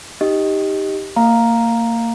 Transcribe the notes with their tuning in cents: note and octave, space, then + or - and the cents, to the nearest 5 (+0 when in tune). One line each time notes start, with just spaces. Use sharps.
D#4 +0 G4 +0 D#5 +5
A#3 -30 F5 +0 A#5 +0